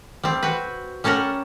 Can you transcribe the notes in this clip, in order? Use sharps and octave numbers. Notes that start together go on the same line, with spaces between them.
G3 C4
C4 F#4 B4
G3 C#4 A4 A#4 F#5